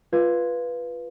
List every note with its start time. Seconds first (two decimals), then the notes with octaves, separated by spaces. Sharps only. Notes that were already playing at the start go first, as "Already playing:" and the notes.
0.12 F4 B4 G#6